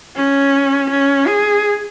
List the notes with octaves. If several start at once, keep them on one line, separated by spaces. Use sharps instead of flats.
C#4
C#4
G#4